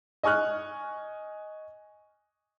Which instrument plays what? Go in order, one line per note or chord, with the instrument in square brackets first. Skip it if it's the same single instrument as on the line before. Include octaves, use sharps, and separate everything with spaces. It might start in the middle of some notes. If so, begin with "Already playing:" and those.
[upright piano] D#5 G#5 C#6 F6 F#6